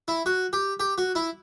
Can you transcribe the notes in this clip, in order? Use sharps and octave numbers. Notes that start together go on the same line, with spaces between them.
E4
F#4
G4
G4
F#4
E4